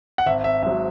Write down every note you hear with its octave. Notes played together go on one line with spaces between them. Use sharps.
F#5
G#1 E5
E5
G#2 F#3 E5